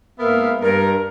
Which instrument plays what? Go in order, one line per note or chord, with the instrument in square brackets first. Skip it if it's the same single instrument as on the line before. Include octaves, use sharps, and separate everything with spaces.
[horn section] G#2 A#3 B3 A#4 E5 F5
G2 A#4